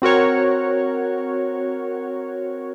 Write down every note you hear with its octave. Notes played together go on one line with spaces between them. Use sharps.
C4 F#4 A#4 C#5